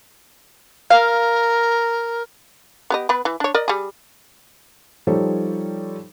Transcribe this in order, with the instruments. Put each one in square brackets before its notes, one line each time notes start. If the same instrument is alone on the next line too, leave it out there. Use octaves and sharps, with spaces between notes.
[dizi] A#4 [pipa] F5
[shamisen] B3 G4 D#5
B3 B4
E3
D4 C#5
A#4 D5 D#5
G3 G#4
[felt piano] F3 G3 D#4 A4 C5 C#5